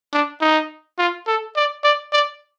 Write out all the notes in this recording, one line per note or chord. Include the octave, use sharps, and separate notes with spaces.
D4
D#4
F4
A4
D5
D5
D5